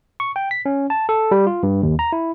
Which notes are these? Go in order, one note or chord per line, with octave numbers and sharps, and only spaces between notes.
C#6
G5
B6
C#4
A5
A4
G3
F4
G2
D#2
A#5
E4